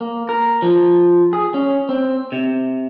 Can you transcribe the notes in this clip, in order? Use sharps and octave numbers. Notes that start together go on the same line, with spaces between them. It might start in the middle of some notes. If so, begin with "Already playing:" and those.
A#3
A#4
F3
G#4
C#4
C4
C3